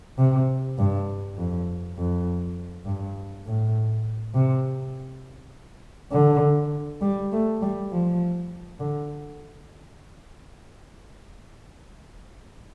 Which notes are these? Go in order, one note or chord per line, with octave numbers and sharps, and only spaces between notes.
C3
G2
F2
F2
G2
A2
C3
D3
G3
A3
G3
F3
D3